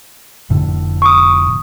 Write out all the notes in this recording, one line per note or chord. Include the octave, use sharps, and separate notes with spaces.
F1 A2 D3
C#6 D#6